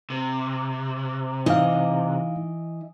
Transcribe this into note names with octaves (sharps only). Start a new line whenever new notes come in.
C3
E3 D#4 D#5 F5